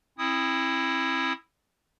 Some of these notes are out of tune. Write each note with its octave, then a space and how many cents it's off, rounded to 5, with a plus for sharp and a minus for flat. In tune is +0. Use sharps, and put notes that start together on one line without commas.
C4 +35 E4 +0 D#6 +0